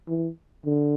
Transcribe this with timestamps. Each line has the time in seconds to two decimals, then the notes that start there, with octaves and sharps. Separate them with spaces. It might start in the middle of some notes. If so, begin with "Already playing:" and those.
0.08 E3
0.66 D3